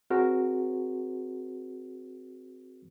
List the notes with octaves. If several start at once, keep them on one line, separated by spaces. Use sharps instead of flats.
C4 F#4 G#4 A#4 C5 C#5